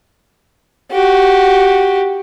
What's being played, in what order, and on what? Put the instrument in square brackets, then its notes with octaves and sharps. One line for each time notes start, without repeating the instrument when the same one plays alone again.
[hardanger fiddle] F#4 G4